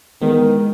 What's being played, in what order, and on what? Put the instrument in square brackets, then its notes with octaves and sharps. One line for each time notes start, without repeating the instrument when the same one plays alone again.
[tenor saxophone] D#3 [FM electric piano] E3 G#3 B3